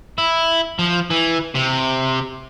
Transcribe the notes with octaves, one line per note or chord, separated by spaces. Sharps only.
E4
F3
E3
C3